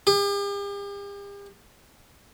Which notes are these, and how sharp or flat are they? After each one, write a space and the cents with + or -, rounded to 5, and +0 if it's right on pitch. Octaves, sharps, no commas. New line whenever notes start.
G4 +45